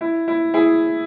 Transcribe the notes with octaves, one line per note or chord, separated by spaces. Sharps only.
E4
E4
E4 G#4